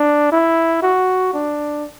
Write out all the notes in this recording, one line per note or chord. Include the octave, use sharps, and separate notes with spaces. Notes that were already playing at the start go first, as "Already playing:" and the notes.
Already playing: D4
E4
F#4
D4